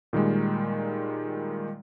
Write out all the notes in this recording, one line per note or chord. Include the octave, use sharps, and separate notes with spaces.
A#2 D#3 G3 G#3